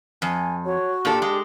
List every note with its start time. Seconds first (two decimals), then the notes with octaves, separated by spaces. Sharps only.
0.22 F2 G#5
0.65 F#4 C#5
1.05 A#2 D4 G4 A4
1.22 G#3